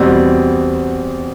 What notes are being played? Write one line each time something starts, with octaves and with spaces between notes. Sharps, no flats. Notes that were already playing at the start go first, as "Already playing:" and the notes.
Already playing: E2 B2 G3 C4